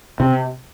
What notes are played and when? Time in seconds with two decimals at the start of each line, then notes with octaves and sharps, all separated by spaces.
0.20 C3